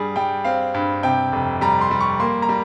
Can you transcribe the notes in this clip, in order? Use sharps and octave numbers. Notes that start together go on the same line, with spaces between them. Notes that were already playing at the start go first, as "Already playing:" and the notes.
Already playing: G2 G3 G#4
G3 G5
C4 F5
G2
C3 G5
F1
G3 A#5
C6
G3
C#6
A#3 C6
A#5
G3